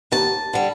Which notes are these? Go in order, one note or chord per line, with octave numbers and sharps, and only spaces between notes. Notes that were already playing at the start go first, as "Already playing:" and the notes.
D#2 A5
D3 G3